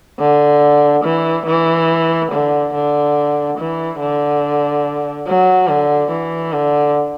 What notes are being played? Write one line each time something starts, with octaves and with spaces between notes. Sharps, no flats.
D3
E3
E3
D3
D3
E3
D3
F#3
D3
E3
D3